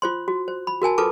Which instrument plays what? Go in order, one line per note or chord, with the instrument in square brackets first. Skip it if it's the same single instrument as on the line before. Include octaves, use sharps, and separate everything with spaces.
[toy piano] F4 C5 C6
F#4
C5
B5
F#4 A#4 G#5 A5
F4 A4 B4 A5 D6